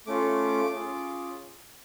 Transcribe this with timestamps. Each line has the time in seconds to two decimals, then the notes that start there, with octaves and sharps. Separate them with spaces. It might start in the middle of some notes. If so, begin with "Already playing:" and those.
0.07 A3 C#4 F4 D6
0.75 C#4 F4 G#4